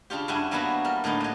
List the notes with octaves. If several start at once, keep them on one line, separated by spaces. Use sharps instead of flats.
C#3 D4 F4 G4
G2 E4 F#4 G#5
F#3 G3 A#3 B3 E4 F#4
G3 A#4
A2 D3 A#3 D#4
F#3 D#5